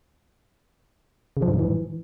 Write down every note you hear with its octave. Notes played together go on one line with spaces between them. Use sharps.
C#3
F3
G2
G#2
E3